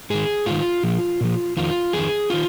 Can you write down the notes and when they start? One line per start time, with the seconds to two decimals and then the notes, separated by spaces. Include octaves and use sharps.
0.10 G#2 D#3 G#4
0.46 G#2 D#3 F4
0.83 A#2 F3
1.21 A#2 F3
1.57 F2 D#3 F4
1.93 F2 D#3 G#4
2.30 D#3 F4